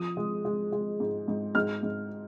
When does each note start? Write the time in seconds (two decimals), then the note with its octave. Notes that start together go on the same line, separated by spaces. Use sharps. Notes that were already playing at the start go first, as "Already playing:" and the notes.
Already playing: F3 D#6
0.17 G#3
0.45 G#3
0.72 G#3
1.00 G#2
1.28 G#2
1.55 G#2 F6
1.83 G#2